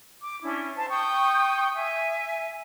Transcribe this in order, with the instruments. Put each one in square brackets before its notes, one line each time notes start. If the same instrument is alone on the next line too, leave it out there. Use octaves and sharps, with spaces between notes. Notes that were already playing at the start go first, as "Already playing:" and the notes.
[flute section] D6
C#4 D4 E4
C5 A5
G5 C#6 D#6 G6
E5 G#5